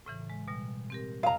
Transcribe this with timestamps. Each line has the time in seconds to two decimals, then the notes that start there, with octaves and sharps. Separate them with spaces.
0.06 A2 C#3 E3
0.30 G#3
0.48 B2 G3
0.90 C4 G4 A#4
1.23 F2 C3 D#5 F5 A#5